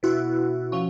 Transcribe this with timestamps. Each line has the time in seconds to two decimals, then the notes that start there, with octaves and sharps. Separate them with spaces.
0.03 B2 E4 F#4
0.72 F3 C#4